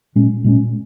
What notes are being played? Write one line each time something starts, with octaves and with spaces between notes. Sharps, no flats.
A#2 G#3 C#4
A#2 G#3 C#4